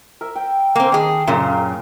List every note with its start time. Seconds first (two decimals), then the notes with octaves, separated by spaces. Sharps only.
0.21 A#4 E5
0.36 G5
0.75 A#3 C4 G#5
0.92 D#3 G#4 D#5 G5 A5
1.27 F#2 A#2 C#3 A#4 D5
1.51 A#4